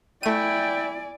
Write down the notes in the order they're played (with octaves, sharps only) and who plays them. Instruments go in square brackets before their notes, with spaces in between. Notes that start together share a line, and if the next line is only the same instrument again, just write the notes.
[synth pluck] A3 D#7 [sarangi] E4 [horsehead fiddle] D5 G#5 [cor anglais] G5